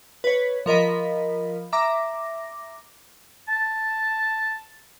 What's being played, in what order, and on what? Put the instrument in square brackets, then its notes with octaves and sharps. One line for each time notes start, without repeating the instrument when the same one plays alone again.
[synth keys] B4 C#5
F3 A#4 D#5 B5
E5 A#5 D6 A#6
[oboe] A5